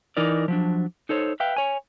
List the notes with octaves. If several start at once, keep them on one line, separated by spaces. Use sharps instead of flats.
E3 D#4 A#4 D5
F3 F#3 D4
D#4 A4 C5 C#5
B4 E5 F5 G5
C#5 G#5